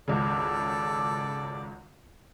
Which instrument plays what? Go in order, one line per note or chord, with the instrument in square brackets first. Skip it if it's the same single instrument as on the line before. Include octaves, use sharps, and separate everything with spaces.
[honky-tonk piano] G#1 C#2 C#3 [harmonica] A4 D5